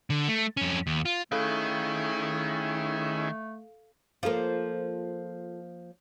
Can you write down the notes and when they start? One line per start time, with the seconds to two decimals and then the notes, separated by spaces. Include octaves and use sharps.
0.10 D3
0.28 A3
0.57 F2 C#4
0.87 D#2
1.05 F4
1.32 D#3 A3 C#4 E4 G#4 A4 F5
4.23 F3 A#3 F4 A4 C5